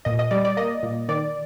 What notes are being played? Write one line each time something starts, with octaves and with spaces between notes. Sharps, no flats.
A#2 D#5
D#5
G3 D5
D5
A#3 D#5
A#2
D#3 D5